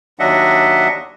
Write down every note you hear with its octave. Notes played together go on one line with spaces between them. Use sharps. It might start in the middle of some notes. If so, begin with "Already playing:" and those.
D#2 F#3 D4 D#5 E5 F#5